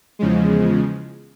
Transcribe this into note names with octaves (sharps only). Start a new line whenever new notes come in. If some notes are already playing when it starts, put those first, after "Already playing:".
E2 C#3 F3 G#3